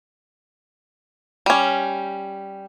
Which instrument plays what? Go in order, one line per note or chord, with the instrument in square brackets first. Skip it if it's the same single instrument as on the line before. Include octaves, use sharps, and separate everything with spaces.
[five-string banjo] G3 C#4